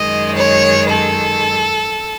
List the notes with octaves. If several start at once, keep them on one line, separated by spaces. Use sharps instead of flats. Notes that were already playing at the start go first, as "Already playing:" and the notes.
Already playing: F#2 D#3 G#3 D#5
C#5
A4